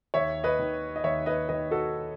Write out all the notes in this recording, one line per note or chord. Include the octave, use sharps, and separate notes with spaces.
D#2 C#5 E5
B4 D#5
D#3
D#5
D#2 C#5 E5
B4 D#5
D#3 B4 D#5
F#4 A4